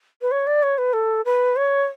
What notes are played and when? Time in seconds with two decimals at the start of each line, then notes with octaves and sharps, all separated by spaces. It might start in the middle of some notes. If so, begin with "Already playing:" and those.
0.22 B4
0.31 C#5
0.47 D5
0.63 C#5
0.78 B4
0.93 A4
1.25 B4
1.56 C#5